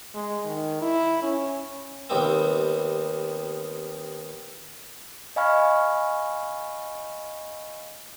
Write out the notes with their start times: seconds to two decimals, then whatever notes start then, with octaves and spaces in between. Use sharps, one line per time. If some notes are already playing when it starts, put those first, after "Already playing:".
0.14 G#3
0.45 D#3
0.82 E4
1.23 C#4
2.10 D#2 G3 B3 C4
5.36 D#5 F5 G#5 B5 C#6 F6